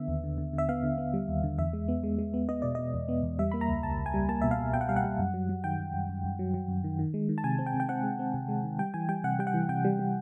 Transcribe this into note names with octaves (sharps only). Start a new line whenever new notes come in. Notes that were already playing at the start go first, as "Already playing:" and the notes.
Already playing: D3 B3 E5
D#2
D3
D3
D3
E5
B3 F5
D3
B3
G3
D#2
D3
E2 E5
G#3
B3
G#3
G#3
B3
B3 D#5
B2 D5
B2 D#5
E2
B3
E2
G3 E5
A#3 B5
A#5
C#2
C#2 A5
C#2
G#5
G3
A#3 A5
B2 E5
F5
B2
B2 G5
F#5
G3 F5
F#5
G3
F#2
F#3
F#3
D#3 G5
F#2
F#2
F#2
F#2
F#3
F#3
F#2
D#3
D#3
G#3
D#3
A5
C3 G#5
C4
G5
C3
G5
C4 F#5
G#3
C4
C3
G#3
D#3
G3 G5
E3 G#5
G3 G5
C3 F#5
G3 G5
F#5
E3
C3 G5
G3
G3